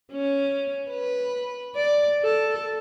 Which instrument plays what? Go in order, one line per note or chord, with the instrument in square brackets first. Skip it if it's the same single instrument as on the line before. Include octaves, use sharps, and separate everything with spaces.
[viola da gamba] C#4
B4
D5
A4